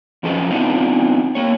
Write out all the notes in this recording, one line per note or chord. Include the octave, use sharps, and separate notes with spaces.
F#2 F3 C#4 A4 B4 D#5
B3 C4 D4 D#4 F4
A#3 C#5